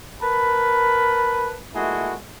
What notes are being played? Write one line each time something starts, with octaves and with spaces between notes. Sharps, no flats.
A#4 B4 A5 B5
A#2 G#3 A3 E4 F#4